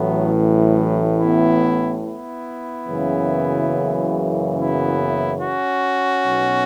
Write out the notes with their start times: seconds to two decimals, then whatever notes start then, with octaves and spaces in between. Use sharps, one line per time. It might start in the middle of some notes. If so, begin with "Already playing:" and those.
Already playing: A1 A2 E3 F#3 B3
0.34 F#3 B3
1.19 B3 E4
2.03 B3 E4
2.88 F#1 F#2 C#3 E3
4.57 B3 E4
5.41 C#4 F#4
6.25 B1 B2